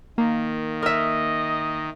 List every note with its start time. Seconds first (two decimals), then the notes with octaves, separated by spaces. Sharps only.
0.18 D#3 A#3
0.82 A#4 D#5 E5